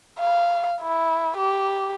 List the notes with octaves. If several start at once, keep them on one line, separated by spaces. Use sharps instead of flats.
F5
E4
G4